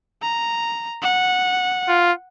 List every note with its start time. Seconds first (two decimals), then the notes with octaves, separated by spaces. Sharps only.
0.22 A#5
1.02 F#5
1.88 F4